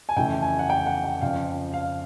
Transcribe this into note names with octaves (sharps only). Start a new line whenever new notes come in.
G#5
F2 C#3 E3 A3 G5
G#5
F#5
G5
F#5
G5
F2 C#3 F3 F5
F5